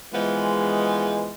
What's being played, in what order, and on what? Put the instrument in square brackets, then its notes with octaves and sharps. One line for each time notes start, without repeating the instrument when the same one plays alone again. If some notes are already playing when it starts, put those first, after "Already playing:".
[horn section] E3 F3 B3 [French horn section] G#3